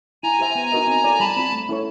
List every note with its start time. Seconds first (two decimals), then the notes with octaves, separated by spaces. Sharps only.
0.23 E4 G#5 A#5
0.39 G4 C5 E5 G5
0.55 B3
0.72 D#4 F#4 A#4 D#5
0.87 C4
1.04 E4 A4 D5
1.20 G3 A5 B5
1.36 C4 F4
1.52 A3
1.69 C#4 E4 A4 C#5